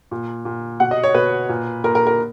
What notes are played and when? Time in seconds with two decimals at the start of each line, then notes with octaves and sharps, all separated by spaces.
0.11 A#2
0.45 A#2
0.80 B2 F#5
0.91 D#5
1.03 C#5
1.14 B2 B4
1.49 A#2
1.84 A#2 A#4
1.95 A#4
2.07 A#4